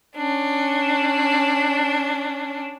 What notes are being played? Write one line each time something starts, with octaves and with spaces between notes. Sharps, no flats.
C#4 D4